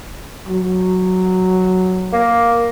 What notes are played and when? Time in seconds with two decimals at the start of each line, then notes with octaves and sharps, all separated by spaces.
0.48 F#3
2.13 A#3